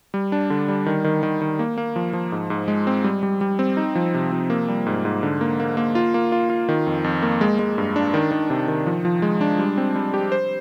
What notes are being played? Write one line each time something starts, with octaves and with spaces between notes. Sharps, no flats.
G3
D4
D3
G3
D#3
D#3
D#3
D#3
A#3
A#3
F3
F3
G#2
G#2
G#3
C4
G3
G3
G3
C4
D#4
F3
C3
F3
A#3
G3
G#2
G#2
D3
A#3
A#3
A#3
F4
A#3
F4
F4
D#3
F2
F2
A#3
G#3
G#3
G2
D4
D#3
D#3
C3
D#3
F3
F3
G#3
D4
G3
C4
G3
G4
C5